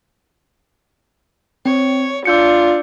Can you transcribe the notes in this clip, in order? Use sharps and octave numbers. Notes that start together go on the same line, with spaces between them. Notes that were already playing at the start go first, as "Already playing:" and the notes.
C4 C#5
D4 F4 E6 G6 C#7